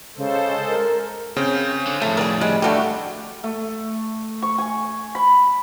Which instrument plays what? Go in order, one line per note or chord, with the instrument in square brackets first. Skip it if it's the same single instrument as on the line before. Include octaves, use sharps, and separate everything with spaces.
[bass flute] C#3 [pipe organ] G#3 A4 C5
[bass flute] A#4
[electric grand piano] C#3 C4 [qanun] G5
[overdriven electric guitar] D3
[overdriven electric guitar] F2 A2 [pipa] A3
[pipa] G#4 A#4 [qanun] D5
[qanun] G3 [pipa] G#3
[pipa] D3 G3 G4 [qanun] A3 F#4
[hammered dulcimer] A3
C#6
G#5
B5